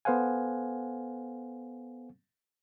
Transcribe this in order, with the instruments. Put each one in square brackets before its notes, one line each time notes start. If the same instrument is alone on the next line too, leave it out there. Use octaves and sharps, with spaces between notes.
[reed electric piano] B3 A4 C5 F5 F#5 G#5